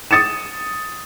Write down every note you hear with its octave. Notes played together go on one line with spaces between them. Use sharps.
D#6 A6 C#7 E7